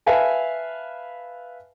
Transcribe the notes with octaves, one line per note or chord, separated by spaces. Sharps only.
B4 E5 F5 G#5 A5